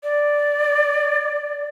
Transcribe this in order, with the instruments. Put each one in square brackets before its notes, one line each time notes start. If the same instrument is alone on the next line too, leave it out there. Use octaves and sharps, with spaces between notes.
[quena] D5